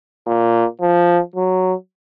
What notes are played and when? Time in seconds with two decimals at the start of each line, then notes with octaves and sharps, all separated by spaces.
0.27 A#2
0.82 F3
1.35 F#3